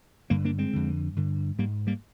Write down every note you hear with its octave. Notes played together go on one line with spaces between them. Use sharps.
G2 D3 G3 A#3
A#3 D4
G#3 C4
F2 D3
G2 D3
G#2 G3 A#3
G3 A#3